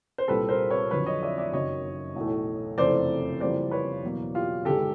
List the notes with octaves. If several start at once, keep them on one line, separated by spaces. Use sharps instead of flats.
C5
C2 A#2 G3 A4 B4
A#4 C5
B4 C#5
F2 D3 F#3 B4 C#5
C#5 D#5
D5 E5
D5 E5
F#1 F#2 D#3 F#3 C#5 D#5
B1 A2 E3 A3
F#1 F2 C3 E3 A3 C5 D5
F2 C#3 E3 G3 A#3 C5 D5
B4 C#5
E2 B2 F#3 A#3
F4 G4
G1 G2 D#3 G#3 G4 A4